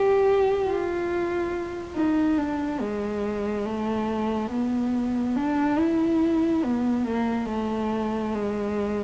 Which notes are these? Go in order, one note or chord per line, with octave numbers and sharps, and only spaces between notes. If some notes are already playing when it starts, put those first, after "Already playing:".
Already playing: G4
F4
D#4
D4
G#3
A3
B3
D4
E4
B3
A#3
A3
G#3